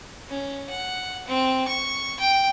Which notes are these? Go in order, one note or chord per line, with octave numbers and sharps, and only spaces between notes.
C#4
F#5
C4
C#6
G5